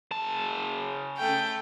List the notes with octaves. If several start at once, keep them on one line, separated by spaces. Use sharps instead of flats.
C#3 A5
A3 G5